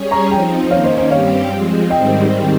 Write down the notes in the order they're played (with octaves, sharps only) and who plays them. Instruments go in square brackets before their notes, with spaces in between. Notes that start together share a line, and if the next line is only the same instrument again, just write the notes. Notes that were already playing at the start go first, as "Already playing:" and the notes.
Already playing: [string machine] G3 C#4 G#4 C#5
[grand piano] A#5 C#6
[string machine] F3 C4 D#4 [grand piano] G5 A#5
[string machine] D#3 A#3 C#4 [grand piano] C#5 F5
[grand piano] C5 D#5
C5 D#5
[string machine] G2 G3 C4 G4 [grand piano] C#5 F5
[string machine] F3 G#3 C4
[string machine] G#2 D#3 G3 C4 [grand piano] D#5 G5